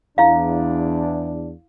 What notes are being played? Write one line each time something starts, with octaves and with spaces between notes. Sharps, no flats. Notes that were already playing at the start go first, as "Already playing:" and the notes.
E2 D4 E4 F5